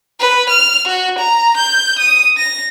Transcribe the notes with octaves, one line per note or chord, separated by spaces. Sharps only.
B4
F6
F#4
A#5
G6
D#6
A#6